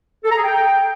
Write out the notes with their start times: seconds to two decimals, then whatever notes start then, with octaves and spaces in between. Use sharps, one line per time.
0.24 A4
0.30 A#5
0.37 G#4
0.43 G5